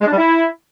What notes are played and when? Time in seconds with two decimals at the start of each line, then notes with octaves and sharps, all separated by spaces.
0.01 G#3
0.07 D4
0.12 G3
0.18 E4